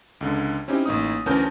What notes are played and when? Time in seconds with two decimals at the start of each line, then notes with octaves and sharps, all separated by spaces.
0.21 C#2 D3
0.68 C4 C#4 D#4 E4 G4
0.86 A1 A#3 D#4 D#6
1.26 D2 E3 C#4 A#4 A5 G6